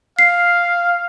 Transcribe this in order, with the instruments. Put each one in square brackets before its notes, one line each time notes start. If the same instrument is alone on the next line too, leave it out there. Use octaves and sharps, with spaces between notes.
[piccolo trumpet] F5 [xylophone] C7